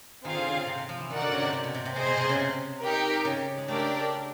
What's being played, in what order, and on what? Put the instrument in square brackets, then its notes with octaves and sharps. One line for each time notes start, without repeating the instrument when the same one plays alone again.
[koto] D#3 [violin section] C4 F4 G#4 C5 F5
[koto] D3
C#3
C3
C3
C3
F3
E3
[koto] D#3 [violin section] D#4 F#4 A#4 D5 F#5
[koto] D3
C#3
C3
C3
B2
C3
C3
[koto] C3 [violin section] G#4 C5 D#5
[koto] B2
C3
C#3
C3
[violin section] D#4 G4 A#4
[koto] C#3
G#3
[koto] A3 [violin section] D4 G4 A#4 D5